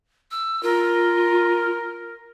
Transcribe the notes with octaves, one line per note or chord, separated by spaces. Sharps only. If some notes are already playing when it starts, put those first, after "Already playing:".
E6
F4 A#4